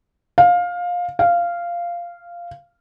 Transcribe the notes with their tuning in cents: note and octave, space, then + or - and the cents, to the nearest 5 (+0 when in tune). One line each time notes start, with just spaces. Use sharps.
F5 +20
F5 -10